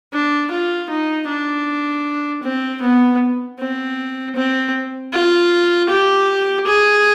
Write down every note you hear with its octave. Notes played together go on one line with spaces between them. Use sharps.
D4
F4
D#4
D4
C4
B3
C4
C4
F4
G4
G#4